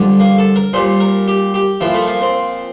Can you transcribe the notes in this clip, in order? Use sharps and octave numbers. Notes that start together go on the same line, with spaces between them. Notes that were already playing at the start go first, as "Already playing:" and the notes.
Already playing: F2 D3 G3
A#3
A4
A#4
A#2 G3 C5
A#4
G4
G4
A#2 F3 E4
A3
A#3
C4